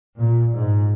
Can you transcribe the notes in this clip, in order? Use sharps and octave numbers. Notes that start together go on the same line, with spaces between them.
A#2
G#2